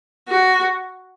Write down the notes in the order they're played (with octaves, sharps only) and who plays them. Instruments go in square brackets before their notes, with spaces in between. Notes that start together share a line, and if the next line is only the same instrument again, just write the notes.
[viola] F#4